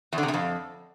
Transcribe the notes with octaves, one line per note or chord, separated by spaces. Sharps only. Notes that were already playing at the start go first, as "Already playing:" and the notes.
E2
D3
C3
E2
F2